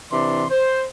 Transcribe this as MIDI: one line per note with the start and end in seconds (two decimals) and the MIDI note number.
0.11 0.44 48
0.11 0.44 52
0.11 0.44 62
0.11 0.44 84
0.50 0.84 72